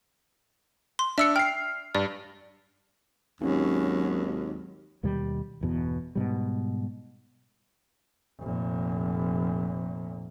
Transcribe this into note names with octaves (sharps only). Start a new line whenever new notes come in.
C6
D4 E5 E6 C#7
G5 F6 C7
G2 D5
G#1 D#2 F#3 C#4
D#2 B2 D#3 G3
G1 E2 B2
G#2 B2 G3
F1 A#2